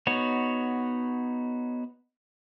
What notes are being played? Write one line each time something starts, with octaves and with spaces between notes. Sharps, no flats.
B3 D#4 F#4 C#5